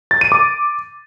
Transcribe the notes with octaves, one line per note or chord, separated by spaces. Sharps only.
A6
D#7
D6